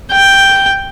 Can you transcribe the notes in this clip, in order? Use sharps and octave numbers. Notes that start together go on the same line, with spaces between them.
G5